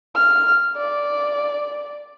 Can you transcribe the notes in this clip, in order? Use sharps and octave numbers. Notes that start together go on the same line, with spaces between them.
F6
D5